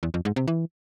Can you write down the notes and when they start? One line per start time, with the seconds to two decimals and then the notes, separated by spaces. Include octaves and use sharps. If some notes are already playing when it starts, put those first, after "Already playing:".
0.03 E2
0.14 F2
0.25 G#2
0.36 C3
0.48 E3